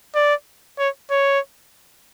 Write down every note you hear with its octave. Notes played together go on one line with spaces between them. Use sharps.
D5
C#5
C#5